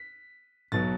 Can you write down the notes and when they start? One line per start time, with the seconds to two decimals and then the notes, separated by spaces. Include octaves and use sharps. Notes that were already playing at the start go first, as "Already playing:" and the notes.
Already playing: B6
0.72 B1 B2 F#3 A6